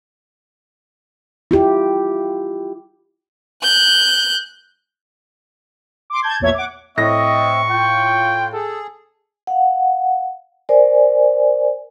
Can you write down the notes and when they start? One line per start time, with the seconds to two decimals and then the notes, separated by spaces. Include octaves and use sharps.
1.51 E4 F4 G4
3.63 F#6 G6
6.10 C6 D6
6.22 A5 G6 G#6
6.40 A#1 E2 A#2 C#5 E5 G#6
6.54 F#5 D6
6.97 A2 C4 D#5 E5 C#6 A#6
7.70 F4 G5
8.53 G#4 A4
9.47 F5 F#5
10.69 A#4 C5 D5 G#5